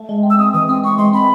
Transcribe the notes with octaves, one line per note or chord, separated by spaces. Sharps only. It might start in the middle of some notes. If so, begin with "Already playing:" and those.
Already playing: A3
G#3
C4
E6
C4 D#6
E3 D#6
C4 D#6
C4 C#6
G#3 C6
C4 B5